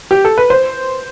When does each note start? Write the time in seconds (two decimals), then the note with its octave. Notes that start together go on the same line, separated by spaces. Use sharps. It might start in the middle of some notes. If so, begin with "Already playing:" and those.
0.11 G4
0.25 A4
0.38 B4
0.50 C5